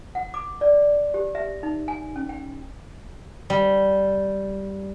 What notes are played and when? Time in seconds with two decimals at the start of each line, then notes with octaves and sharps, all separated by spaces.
0.15 F#5
0.34 D6
0.61 D5
1.14 G4
1.35 E5
1.63 D#4
1.88 G#5
2.16 C#4
2.29 G5
3.50 G3